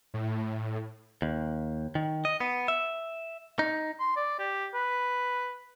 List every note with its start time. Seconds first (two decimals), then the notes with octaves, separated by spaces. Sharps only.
0.14 A2
1.22 D#2
1.95 D#3
2.25 D#5
2.40 B3
2.68 E5
3.59 D#4
4.00 C6
4.16 D5
4.39 G4
4.74 B4